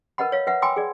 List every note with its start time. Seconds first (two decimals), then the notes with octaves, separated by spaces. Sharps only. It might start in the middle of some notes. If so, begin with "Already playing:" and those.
0.18 A#4 B4 D#5 F#5 B5
0.32 C#5 F5
0.47 B4 E5 F#5
0.62 G5 G#5 B5 C6 D6 E6
0.76 G#4 D5